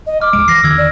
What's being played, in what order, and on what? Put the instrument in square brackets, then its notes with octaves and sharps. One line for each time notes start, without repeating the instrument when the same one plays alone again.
[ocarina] D#5
[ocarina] D6 [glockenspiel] F6
[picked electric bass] D#1 C#2 G#3 [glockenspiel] D7
[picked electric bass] E3 [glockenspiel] A#6 C7
[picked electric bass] E2 D3 D#3 [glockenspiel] E6 G#6
[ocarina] D5